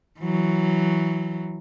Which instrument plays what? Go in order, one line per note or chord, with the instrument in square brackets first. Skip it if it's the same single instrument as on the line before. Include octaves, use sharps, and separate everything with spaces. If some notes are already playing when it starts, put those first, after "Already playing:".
[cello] E3 F#3